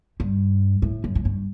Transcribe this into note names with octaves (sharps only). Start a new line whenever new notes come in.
G2
A2
F#2
A2
G2